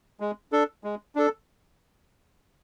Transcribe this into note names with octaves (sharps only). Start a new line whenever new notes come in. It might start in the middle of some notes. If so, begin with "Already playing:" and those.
G#3
D4 A4
G#3
D4 A4